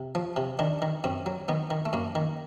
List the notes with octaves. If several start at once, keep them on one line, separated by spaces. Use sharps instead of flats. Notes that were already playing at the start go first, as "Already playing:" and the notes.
Already playing: C3
F3
C3
D#3 D4
D#3
F#2 C4
F#3
D#3 B3
D#3
A3
F#2 A#3
D#3